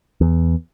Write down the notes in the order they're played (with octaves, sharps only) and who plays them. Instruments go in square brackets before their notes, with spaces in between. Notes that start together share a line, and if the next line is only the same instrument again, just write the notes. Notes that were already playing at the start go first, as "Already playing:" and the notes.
[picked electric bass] E2